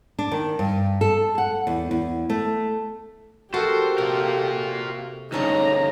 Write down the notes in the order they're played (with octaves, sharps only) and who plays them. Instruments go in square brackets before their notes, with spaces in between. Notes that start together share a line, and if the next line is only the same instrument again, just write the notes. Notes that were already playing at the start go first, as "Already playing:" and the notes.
[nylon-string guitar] D4
D#3
G2
A4
F#5
E2
E2
A3
[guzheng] A3 A#4 A5 [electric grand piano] F#4 A4 [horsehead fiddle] G4 [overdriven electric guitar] C5
[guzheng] C3 [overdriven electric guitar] F4 A#4
[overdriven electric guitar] D2 G2 [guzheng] C#3 C#4 A4 [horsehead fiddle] D#4 A#5